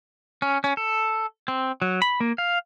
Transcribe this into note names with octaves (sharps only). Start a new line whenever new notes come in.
C#4
C#4
A4
C4
F#3
B5
A#3
F5